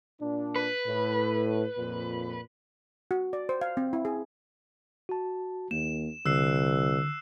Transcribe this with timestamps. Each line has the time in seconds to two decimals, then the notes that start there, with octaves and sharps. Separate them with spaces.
0.20 A#2 D4
0.56 B4
0.86 A2
1.77 F2 A#2
3.11 F#4
3.33 D5
3.49 C5
3.61 F5
3.77 C4
3.93 E4
4.05 G#4
5.09 F#4 A5
5.71 D#2 A#3 E7
6.26 C2 D3 E6 F#6 C7